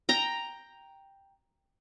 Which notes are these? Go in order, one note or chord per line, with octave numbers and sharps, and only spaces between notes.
G5 A#5